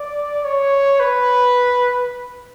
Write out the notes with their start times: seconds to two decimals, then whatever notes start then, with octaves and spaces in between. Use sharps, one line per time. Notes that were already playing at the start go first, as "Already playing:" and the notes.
Already playing: D5
0.45 C#5
1.00 B4